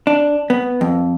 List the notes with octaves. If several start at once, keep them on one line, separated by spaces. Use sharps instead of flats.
D4
B3
F2